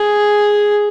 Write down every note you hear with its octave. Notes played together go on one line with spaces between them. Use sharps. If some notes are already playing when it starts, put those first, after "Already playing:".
Already playing: G#4